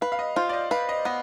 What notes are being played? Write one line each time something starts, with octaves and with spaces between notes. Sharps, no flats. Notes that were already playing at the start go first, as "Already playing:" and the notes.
B4 F5
F5
D#5
F4 C5
D5
D#5
B4 F5
D#5
B3 D#5